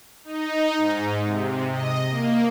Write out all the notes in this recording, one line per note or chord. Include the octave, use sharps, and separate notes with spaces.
D#4
G#2
C3
D#5
A#3